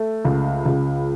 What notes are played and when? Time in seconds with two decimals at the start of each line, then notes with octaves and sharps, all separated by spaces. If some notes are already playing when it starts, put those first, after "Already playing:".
Already playing: A3
0.25 C#2
0.66 C#2